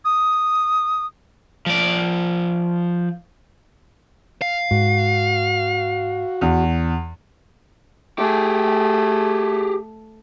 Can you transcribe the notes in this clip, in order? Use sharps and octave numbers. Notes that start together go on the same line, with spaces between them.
D#6
F3 D5
F5
G#2 F#4
E2
A3 G4 G#4